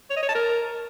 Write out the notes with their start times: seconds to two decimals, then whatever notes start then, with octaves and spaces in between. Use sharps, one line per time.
0.10 C#5
0.16 D#5
0.23 C#5
0.29 A5
0.35 A#4